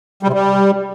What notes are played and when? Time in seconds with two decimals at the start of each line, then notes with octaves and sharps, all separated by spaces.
0.23 G3
0.28 C3
0.33 G3